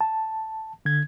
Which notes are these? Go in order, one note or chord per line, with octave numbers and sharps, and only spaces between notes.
A5
D3 G#6